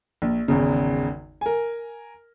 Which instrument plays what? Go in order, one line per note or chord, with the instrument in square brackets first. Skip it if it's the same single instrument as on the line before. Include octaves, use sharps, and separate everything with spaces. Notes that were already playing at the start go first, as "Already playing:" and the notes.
[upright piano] A#1
G#1 E2 C#3
A#4 G#5